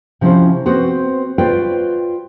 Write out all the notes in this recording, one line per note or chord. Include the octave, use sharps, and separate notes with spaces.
C3 F3 C#4 E4 C5
B3 C4 F#4 C5
F4 F#4 B4 C5 D5 G5